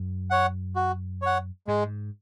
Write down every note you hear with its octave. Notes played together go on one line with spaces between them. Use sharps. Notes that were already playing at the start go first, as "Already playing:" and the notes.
Already playing: F#2
C#5 F#5
F#4
C#5 F#5
G#2 G#3